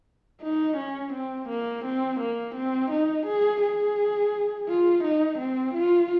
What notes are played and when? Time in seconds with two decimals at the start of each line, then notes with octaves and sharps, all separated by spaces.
0.43 D#4
0.77 C#4
1.13 C4
1.49 A#3
1.85 C4
2.20 A#3
2.55 C4
2.91 D#4
3.26 G#4
3.62 G#4
4.68 F4
5.04 D#4
5.39 C4
5.75 F4